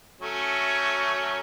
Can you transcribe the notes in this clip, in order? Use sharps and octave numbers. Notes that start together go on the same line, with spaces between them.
F#3 A3 C#4